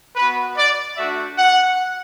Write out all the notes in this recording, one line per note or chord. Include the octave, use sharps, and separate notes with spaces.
B3 F#4 B4
D5
A3 D4 F#4 E5
F#5